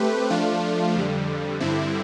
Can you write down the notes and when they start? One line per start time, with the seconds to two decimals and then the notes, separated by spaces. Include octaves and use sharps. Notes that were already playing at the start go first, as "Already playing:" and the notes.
Already playing: A3 C4 G4 B4
0.30 F3 A3 D4 F4
0.95 F2 D3 G3
1.60 G2 D3 G3 C4 E4